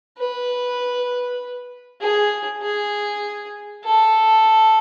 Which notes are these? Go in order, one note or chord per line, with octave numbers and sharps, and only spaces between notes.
B4
G#4
G#4
A4